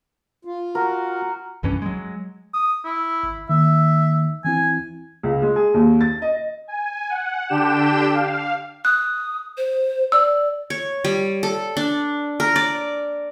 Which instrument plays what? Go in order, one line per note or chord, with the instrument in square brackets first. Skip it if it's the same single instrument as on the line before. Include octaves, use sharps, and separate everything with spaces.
[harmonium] F4
[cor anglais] F#4 [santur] A#4
[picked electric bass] C2 G2 E3 C#4
F#3 G#3
[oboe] D#6
E4
[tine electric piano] G#1
[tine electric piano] D#3 A#3 [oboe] E5
[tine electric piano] E3 C4 E4 [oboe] G#5
[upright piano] C#2
G#3
G#4
D#2
A6
D#5
[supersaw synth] G#5
F#5
D3 D4 G4 G5 E7
F5
[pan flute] D#6 [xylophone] F#6
[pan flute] C5
[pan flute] D5 [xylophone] E6
[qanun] C#5
G3
A4
D4
A#4
D5